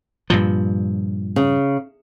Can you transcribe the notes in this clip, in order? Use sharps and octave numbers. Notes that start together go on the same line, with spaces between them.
G2 A#2 F3
C#3